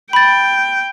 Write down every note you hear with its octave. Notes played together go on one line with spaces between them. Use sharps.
G5 B5 A6